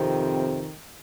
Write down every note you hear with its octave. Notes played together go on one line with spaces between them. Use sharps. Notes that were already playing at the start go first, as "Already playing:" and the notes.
Already playing: F2 C3 D#3